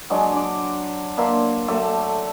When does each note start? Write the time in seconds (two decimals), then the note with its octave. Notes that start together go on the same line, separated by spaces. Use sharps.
0.10 F#3 G#3 D4 C#5
0.33 D4 D6
1.17 A#3 D4 E5 C6
1.68 F#3 A3 A4 E5